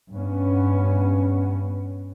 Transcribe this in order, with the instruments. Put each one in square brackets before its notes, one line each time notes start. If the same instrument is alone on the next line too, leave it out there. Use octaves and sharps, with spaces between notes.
[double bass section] G2 B3 C#4